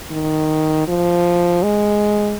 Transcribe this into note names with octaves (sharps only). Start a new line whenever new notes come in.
D#3
F3
G#3